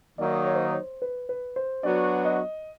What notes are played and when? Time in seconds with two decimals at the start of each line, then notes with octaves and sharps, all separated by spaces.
0.18 D#3 F#3 A#3 D#4 D5
0.46 C#5
0.55 C5
0.64 C#5
0.73 C5
1.02 B4
1.29 B4
1.56 C5
1.83 F#3 B3 D4 F#4 D5
2.25 D#5